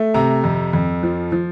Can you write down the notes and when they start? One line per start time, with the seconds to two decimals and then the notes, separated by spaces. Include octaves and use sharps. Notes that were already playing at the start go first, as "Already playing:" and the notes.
Already playing: A3
0.14 C3 A#5
0.44 F2
0.73 F2
1.03 F3
1.32 F3